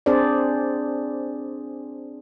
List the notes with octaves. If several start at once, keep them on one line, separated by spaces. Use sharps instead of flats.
C4 D4 G#4 C5 D5